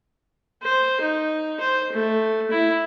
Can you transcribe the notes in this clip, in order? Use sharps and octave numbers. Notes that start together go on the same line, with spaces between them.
C5
D#4
C5
A3
E4